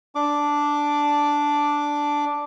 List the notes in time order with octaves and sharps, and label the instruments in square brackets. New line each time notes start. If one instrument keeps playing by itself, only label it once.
[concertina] D4 D6